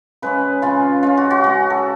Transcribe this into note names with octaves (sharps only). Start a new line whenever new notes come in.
C#3 G#3 C#4 B4
C#3 G#3 C#4 F4
C#3 G#3 C#4 F4
F#4
F#4
C#3 G#3 C#4 F#4
A4